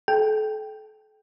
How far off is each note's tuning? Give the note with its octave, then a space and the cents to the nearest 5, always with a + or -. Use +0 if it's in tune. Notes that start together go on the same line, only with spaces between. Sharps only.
A4 -35 G5 +0